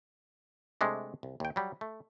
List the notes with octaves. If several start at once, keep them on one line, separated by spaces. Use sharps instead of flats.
C3 G#3 A3 D4
C2
D#2 G5
F#3 G3
A3